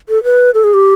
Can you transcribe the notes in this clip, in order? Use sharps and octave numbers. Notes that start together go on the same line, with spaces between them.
A4
B4
A4
G#4
G4